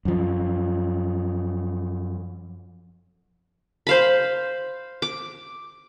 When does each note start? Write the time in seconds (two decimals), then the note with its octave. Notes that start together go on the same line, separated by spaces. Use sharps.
0.05 F#2 F3
3.87 C5 F5 B5
5.02 D6